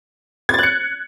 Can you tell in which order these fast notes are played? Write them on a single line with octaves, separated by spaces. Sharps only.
G#6 A6 F#6 C#7